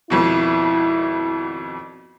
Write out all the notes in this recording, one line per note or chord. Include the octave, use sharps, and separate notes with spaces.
G#1 F2 B2 E4